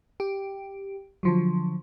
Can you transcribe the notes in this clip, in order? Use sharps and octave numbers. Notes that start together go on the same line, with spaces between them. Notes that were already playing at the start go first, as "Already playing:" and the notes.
G4
D3 F3 F#3